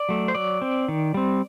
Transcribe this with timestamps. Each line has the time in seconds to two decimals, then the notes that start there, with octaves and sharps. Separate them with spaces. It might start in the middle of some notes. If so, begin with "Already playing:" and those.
Already playing: D5
0.09 F#3 A3
0.28 C5
0.35 F#3 D5
0.62 C4
0.88 D#3
1.14 G3 C4